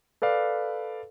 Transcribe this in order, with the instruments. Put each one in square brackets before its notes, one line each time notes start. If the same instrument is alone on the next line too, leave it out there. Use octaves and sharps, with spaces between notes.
[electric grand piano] A4 B4 D5 F5